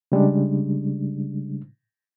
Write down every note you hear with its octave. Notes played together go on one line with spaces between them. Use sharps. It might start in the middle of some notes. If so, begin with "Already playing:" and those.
C#3 G3 G#3 D4